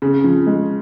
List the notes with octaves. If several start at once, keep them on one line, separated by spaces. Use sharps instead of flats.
C#3
F3
G#3